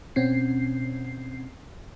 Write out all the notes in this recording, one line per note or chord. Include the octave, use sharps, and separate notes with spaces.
B2 C4 C#4 C7